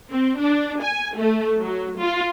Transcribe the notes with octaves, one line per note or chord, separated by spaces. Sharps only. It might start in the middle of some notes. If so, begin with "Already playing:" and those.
C4
D4
G#5
A3
F#3
F4